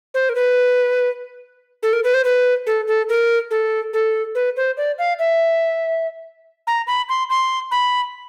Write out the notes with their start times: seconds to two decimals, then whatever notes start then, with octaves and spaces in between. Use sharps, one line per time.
0.14 C5
0.29 A#4
0.35 B4
1.83 A4
1.93 A#4
2.04 B4
2.14 C5
2.24 B4
2.67 A4
2.88 A4
3.09 A#4
3.51 A4
3.93 A4
4.35 B4
4.57 C5
4.77 D5
4.99 F5
5.19 E5
6.67 A#5
6.87 B5
7.09 C6
7.30 C6
7.71 B5